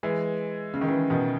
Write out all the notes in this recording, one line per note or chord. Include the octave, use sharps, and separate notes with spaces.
E3 G#3
C#3
D#3
C#3 E3
B2 D#3